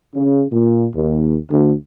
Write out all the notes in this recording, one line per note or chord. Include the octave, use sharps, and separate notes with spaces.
C#3
A#2
D#2
D2